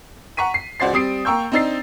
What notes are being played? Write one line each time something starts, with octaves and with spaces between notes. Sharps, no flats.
F#5 A#5 C#6 B6 D#7
C7
C#2 F#4 C5 D5 A6 C7
G3 C4 D#6 C7 D7
A#3 G5 A#5 C#6 E6 G6
C4 D4 D#4 E6 A6 C7